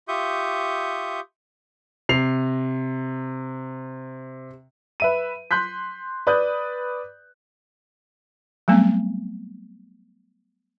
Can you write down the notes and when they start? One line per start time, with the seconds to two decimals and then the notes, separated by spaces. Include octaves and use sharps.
0.08 F4 G4 E5 C#6 D#6 G6
2.09 C3 C7 F7
5.00 B4 E5 D#7
5.51 C6 F#6 G6 B6
6.27 B4 D5 D#6 F#6 G6
8.68 F#3 G3 A3 B3 C4